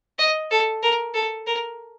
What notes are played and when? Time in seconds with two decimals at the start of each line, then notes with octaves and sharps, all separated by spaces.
0.19 D#5
0.51 A4
0.83 A#4
1.14 A4
1.47 A#4